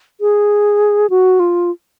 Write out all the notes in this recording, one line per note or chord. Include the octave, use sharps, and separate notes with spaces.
G#4
F#4
F4